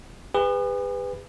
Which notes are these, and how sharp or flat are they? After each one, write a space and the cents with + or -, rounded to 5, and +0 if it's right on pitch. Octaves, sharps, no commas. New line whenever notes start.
G#4 -45 B4 +15